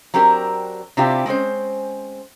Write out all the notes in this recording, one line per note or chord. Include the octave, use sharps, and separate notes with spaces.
F#3 C4 D4 G4 A#4
C3 C4 D4 E4 F4 G4
G#3 C4 C#4 C5